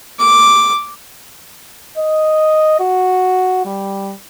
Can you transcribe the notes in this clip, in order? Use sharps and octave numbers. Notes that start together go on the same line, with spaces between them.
D6
D#5
F#4
G3